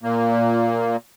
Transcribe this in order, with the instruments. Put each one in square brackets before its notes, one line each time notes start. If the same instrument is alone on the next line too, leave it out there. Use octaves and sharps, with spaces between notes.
[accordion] A#2 A#3